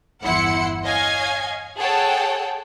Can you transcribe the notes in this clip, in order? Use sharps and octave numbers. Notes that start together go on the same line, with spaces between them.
G1 E2 E4 F#5 C6 C#7
C#5 D#5 F5 G#5 G#6
G#4 A4 C#5 F#5 G5 A5